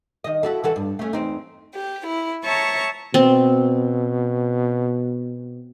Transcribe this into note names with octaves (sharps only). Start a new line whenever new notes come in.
D#3 D#5
E4 F#4 A4
E3 F#4 A4
G2
A3 C#4
E2 C4 D#4
G4
E4
C#5 E5 A5 A#5 C#6
B2 C4